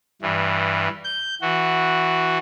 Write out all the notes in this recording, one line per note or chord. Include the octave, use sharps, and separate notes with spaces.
G2 E3
G6
E3 F#4